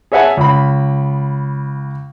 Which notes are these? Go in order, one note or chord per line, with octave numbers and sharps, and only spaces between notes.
G#4 C#5 E5 F#5 G#5 A5
C#2 B5